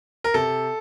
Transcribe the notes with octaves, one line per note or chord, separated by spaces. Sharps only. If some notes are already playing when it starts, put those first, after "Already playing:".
A#4
C3 A4